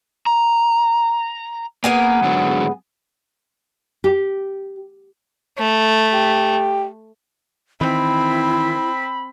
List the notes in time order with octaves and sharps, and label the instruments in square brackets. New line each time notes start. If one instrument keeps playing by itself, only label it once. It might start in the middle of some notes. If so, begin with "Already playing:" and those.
[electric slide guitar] A#5
[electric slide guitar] A#3 [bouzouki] B3 G#4 G#5
[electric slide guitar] G#2 D3 F#3
[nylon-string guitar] G4
[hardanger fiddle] A3
[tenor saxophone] G4
[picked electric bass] D#3 E3 [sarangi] C4 [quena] E4 [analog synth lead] B5